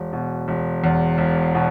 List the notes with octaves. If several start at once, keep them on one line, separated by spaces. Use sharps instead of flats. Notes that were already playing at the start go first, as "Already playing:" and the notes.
Already playing: E1
B2
E1
E2
E1
B2